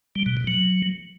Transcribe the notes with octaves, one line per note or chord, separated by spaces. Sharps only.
G3
B2
B2
F#3